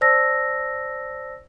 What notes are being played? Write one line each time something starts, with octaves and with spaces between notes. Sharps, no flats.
C5 D5 A5 E6 A#6